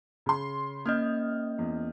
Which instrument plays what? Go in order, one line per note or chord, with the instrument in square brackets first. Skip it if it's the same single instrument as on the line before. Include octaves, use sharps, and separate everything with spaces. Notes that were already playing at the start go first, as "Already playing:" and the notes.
[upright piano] C#3 C6
[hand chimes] A#3 C#4 D#5 [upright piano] F6 G6
[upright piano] E2